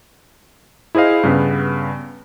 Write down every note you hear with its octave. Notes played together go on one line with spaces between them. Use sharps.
E4 G#4 C5 D#5 F5
G2 C#3 B3